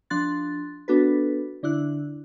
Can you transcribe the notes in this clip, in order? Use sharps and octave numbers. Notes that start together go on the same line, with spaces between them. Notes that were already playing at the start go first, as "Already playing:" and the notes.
F3 D4 C6 F#6 A6
B3 D4 F#4 A4 B4
D3 D4 E4 F#6